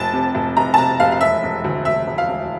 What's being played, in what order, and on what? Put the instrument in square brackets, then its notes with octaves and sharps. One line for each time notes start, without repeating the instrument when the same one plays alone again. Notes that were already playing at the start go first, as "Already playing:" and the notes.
Already playing: [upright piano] F1 A5
C3
F1
F1 A#5
A5
C3 A#5
F1 F5
F5
E1 E5
E1
D2
E1 E5
E1
F5
E1